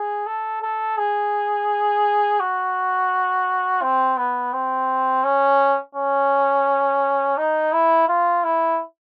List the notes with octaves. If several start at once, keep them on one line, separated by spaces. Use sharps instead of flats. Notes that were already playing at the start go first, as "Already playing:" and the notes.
Already playing: G#4
A4
A4
G#4
F#4
C4
B3
C4
C#4
C#4
D#4
E4
F4
E4